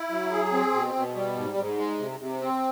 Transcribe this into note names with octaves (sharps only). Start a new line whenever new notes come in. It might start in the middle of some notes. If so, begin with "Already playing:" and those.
Already playing: E4
F#3
G#4
C4
B2
B2
G3
G#2
G#2
G#3
C3
C3
C4